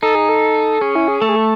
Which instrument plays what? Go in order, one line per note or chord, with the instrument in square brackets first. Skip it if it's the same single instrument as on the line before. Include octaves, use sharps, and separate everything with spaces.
[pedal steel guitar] D#4 [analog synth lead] A4
[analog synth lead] G#4
A4
[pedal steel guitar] C#4 [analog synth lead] G#4
[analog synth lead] E4
G#4
[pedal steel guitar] A3 [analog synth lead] A4
[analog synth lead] G#4
A4